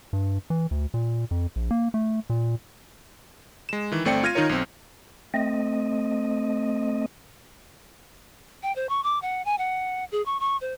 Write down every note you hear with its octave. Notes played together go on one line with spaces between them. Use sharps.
G2
E3
D2
A#2
F2
A#1
A#3
A3
A#2
G#3 E7
D#3 E3
G1 A3 C4 D5 G5 C#7
F4 F6 G#6 A#6 D#7
D#3 D#4 F4 A#4 C#5
B1 C4
A3 C4 D#5
G5
C5
C#6
D6
F#5
G#5
F#5
G#4
C#6
C#6
C5